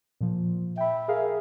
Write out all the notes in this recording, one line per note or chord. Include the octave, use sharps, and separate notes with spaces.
A#2 F3
E5 G5 B5
G#4 A#4 F5